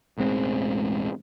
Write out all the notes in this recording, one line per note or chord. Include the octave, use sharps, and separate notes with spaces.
E1 A1 G#3 C4